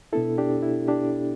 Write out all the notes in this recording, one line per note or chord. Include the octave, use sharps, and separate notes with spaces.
B2 B3 D4 E4 A4
D4 G4
E4
D4 G4